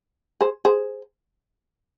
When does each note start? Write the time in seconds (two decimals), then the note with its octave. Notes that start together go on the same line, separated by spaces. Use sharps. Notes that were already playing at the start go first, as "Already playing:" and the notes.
0.41 G#4 C5
0.65 G#4 C5